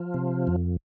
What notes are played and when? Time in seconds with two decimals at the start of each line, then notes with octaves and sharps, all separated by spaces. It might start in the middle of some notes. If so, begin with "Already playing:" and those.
Already playing: F3
0.14 C3
0.47 F2